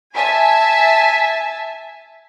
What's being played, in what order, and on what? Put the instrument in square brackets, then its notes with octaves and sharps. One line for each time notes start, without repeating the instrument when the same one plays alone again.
[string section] E5 G#5 A5